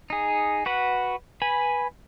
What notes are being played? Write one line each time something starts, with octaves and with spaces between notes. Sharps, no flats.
D#4 G#4
F#4 B4 F#5
B4 G#5 B5